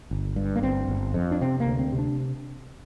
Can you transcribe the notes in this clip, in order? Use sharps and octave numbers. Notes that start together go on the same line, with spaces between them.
G1
G2
A#3
G1 C4
G1
F2
D4
C3 C4
A#3
D2
C4
C3
D4